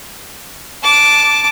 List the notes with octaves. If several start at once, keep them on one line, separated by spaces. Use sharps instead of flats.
A5 D6